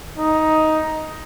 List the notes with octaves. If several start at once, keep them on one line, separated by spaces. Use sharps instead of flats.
D#4